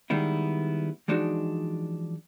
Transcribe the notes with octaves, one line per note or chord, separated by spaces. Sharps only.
D#3 G3 G#3 B3 E4
E3 F3 G#3 D4 D#4 F#4